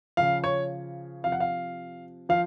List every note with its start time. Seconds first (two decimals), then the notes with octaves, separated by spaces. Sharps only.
0.17 C#3 F3 F5
0.44 C#5
1.23 C3 F3 F5
1.32 F#5
1.40 F5
2.29 F3 F5